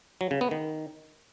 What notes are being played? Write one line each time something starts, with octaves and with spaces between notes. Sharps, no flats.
F#3
C#3
B3
D#3